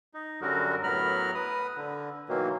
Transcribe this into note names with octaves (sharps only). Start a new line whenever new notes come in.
D#4
F#2 D3 F#3 G3 F#4 A#4
A2 F#3 B3 A#4 B5 F6
B4 D#6
D3
B2 D#3 E3 F#3 A#3